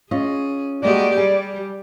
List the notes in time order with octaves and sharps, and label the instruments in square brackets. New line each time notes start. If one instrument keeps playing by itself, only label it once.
[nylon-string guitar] C#4 F4 D#5 [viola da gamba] G#4
[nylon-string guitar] G3 A#3 F#4 [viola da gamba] G#3 G4 [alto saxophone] D5
[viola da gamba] G3 [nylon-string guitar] G#4